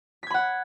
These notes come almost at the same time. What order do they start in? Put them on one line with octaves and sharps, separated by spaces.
B6 G#6 B5 F#5